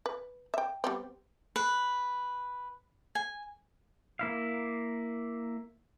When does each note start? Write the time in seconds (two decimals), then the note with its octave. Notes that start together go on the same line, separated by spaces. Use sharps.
0.06 B4
0.54 E5 G5
0.84 G3 B3 C4
1.56 B4
3.15 G#5
4.19 A#3 E4 F5